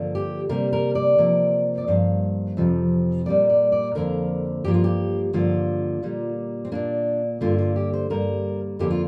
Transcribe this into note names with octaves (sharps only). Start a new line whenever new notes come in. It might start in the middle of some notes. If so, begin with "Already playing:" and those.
Already playing: G2 D3 F3 A#3
G4
C3 G3 A#3 A#4
A#4
D5
C3 F3 A#3
D5
G2 F3 A#3 F5
F2 C3 F3
A#2 G3 A#3 D5
D5
D5
F2 D3 F3 A#3 A#4
G2 F3 A#3 G4
F4
G4
G2 D3 F3 A#3 F4
A#2 G3 A#3
C4
A#2 A#3 D4
G2 D3 A#3 F4
F4
G4
C5
G2 G3 A#3 A#4
F2 D3 A#3 G4
F4